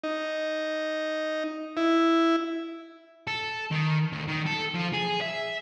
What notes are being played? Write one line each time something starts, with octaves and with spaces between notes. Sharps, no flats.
D#4
E4
A4
D#3
D2
D#3
A4
F3
G#4
E5